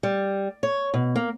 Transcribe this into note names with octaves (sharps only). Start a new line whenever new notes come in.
G3
C#5
B2
A#3